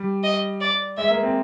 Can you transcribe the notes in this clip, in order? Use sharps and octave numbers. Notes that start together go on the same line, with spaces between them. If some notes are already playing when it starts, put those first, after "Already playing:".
Already playing: G3
D#5
D5
G#3 E5
A#3
C4